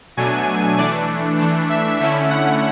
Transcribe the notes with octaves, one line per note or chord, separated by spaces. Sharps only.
B2 F#3 A3 D4 G#5
E3 A3 D4 D5
E3 A3 D4
E5
D3 A3 C#4 E4 E5
F#5